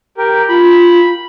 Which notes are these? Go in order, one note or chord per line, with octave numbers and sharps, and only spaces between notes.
G4 A#4
F4 B5